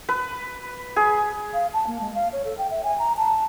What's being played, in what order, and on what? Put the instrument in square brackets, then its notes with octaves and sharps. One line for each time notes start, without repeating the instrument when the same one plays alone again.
[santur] B4
G#4
[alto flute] F5
A5
A#3
G#3
F5
C#5
A4
G5
E5
G#5
A#5
A5